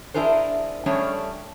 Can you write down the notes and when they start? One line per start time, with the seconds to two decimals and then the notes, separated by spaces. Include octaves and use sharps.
0.14 D4 E4 G#4 A#4 C5
0.86 G3 A3 C#4 D4 G#4 C#5